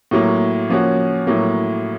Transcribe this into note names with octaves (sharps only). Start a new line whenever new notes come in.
A2 F#3 A#3
F3 A#3 C#4 F#4
A2 F#3 A#3